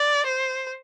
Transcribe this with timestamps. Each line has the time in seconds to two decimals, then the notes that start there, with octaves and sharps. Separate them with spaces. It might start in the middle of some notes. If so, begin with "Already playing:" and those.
Already playing: D5
0.26 C5